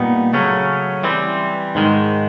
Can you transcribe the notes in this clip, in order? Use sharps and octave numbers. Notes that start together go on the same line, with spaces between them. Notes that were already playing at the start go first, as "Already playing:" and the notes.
Already playing: A#2 G3 B3 D#4
C#3 F#3 A3 C#4
E3 G3 C4
G#2 D#3 G#3